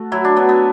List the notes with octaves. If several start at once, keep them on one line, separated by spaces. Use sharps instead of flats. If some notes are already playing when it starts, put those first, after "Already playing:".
Already playing: A3 F#4
F#3 E4
D4
F#3 B3
B3